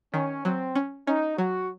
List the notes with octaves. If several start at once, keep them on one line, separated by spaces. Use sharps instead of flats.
D#3 C#4
F#3 C4
C#4
C#4 D#4
F#3 F#4